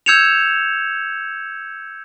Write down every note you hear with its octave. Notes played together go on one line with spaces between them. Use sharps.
E6 G6 G#6 C#7 E7 F7